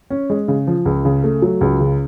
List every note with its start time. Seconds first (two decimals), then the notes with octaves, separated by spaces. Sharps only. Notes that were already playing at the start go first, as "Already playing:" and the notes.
0.10 C#4
0.30 G#3
0.48 C#3
0.67 F3
0.86 C#2
1.05 C#3
1.24 A3
1.42 F#3
1.61 C#2
1.80 C#3